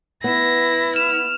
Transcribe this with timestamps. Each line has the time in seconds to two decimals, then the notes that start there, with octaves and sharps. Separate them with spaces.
0.24 B3 E4 A#6
0.96 F6 E7